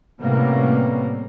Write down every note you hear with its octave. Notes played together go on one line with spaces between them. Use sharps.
A2 C3 G3 A#3 B3 C#4